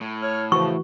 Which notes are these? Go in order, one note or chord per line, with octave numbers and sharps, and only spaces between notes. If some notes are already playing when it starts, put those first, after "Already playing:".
A2
C#5 F6
C#3 E3 F3 F#4 C#6